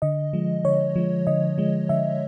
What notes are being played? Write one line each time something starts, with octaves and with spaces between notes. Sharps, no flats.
D3 D#5
F3 G#3
D3 C#5
F3 G#3
D3 D#5
F3 G#3
D3 E5